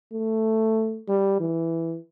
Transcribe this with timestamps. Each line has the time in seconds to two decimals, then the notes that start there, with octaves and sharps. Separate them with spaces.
0.13 A3
1.08 G3
1.40 E3